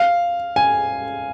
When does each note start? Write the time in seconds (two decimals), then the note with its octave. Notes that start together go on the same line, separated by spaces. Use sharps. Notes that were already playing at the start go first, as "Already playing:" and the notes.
Already playing: F5
0.56 G#5